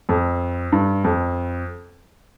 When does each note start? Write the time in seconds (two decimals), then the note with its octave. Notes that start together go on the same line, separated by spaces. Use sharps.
0.09 F2
0.72 G2
1.04 F2